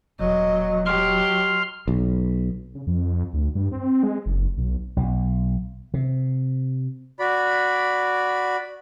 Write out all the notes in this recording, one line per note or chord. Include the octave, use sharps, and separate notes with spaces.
E1 A#2 F#3 D#5
F#3 G4 C6 F6
B1
C#3
F2
D2
G2
C4
G#3
F#1
B1
B1
C3
F#4 D5 B5